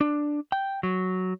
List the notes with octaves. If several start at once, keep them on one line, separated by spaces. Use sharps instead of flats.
D4
G5
F#3